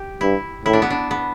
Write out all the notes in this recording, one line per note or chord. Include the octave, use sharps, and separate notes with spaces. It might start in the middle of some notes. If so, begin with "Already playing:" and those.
Already playing: G4
G2 E4
A2 E4
D4
B3
D4
B3